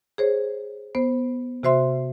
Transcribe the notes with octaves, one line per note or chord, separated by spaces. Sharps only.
G#4 C5 C#5
B3 C5
C3 F#4 C5 E5 C6